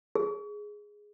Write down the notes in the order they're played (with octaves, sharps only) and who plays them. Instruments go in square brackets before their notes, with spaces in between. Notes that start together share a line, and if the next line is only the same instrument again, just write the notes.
[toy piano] G#4